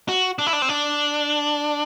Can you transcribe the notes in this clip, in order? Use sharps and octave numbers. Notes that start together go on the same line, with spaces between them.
F#4
D4
E4
D4
C4
D4